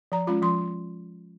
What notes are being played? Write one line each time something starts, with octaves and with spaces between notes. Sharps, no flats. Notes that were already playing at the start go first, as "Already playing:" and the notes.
F3 A#5
G#3 C#4 F4 B5
F3 C6